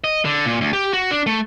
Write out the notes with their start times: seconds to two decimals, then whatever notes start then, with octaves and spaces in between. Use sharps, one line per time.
0.04 D#5
0.25 D3
0.46 A#2
0.61 D2
0.73 G4
0.93 F#4
1.11 D4
1.26 A3